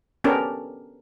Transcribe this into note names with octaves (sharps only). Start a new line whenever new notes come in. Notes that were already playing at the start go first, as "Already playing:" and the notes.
B3 C#4 D4 G4 A4 A#4